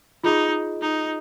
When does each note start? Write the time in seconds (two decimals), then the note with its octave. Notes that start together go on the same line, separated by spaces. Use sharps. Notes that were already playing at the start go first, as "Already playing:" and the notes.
0.24 D#4 F4 G#4 D#5
0.82 D#4